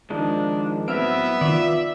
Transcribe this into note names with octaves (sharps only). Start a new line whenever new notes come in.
D#3 F3 G#3 D4
A2 F#3 B3 C4 E5 E6 F6 D7
D#3 F4 D5